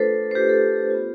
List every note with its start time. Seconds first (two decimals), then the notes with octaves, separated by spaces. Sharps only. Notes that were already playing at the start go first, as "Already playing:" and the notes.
Already playing: A3 D4 F4 A4 B4 C5
0.31 C5
0.35 A3 D4 F4 G4 B4
0.49 A4
0.91 B3 F4